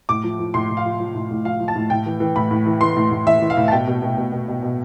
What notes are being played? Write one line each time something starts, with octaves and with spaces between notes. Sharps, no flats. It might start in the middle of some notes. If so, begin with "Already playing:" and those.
A2 D6
F3
F3
A2 C6
A2
F5
F3
F3
A2
A2
F3 F5
F3
A5
A2
A2 G5
E3
E3
A2 B5
A2
E3
E3 C6
A2
A2
E3 E5
E3
F5
A2
A5
B2 G5
B2
B2
B2
B2
B2
B2